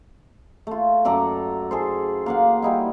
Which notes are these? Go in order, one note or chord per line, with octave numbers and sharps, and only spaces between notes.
A3 F4
F#2 A4 D5 A#5
G#4 A4 C5
A#3 F5 F#5
G3 D#4 E4